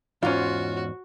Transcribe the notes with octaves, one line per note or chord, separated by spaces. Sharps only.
E2 G#2 C#4 F4 F#4